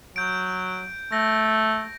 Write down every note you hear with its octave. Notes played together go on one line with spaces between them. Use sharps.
F#3 G6 D7
A3 A#6